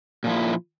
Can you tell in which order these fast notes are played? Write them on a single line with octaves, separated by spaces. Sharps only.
A#2 F3 E4